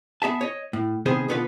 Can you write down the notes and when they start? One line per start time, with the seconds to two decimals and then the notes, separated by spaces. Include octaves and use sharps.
0.22 B3 G#4 E5 A5
0.41 C#5 D#5
0.73 A2
1.06 C3 D#3 B3 G#4 C5
1.28 B2 D3 B3 F4 G4 B4